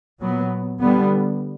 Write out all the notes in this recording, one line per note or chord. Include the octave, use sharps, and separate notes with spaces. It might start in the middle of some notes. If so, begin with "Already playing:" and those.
A#2 F#3 B3
D3 G3 B3